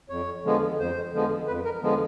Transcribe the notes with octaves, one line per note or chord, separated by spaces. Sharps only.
F2 C#5
D3 F3 G#3 B3
F2 C5
D3 F3 G#3 B3
F2 B4
A#4
D3 F3 G#3 B3